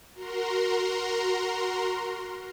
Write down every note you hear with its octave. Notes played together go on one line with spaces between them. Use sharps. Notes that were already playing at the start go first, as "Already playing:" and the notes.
F#4 A#4 A#5 C6